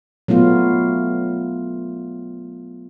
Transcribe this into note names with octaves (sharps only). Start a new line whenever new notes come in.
F#3 A3 B3 F4